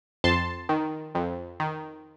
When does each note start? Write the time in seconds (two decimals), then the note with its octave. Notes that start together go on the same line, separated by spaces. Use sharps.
0.24 F2 A5 C6
0.69 D#3
1.15 F2
1.60 D#3